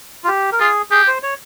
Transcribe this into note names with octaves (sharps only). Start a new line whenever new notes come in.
F4
G4
A#4
F4 G#4
G4 G#4
C5
C#5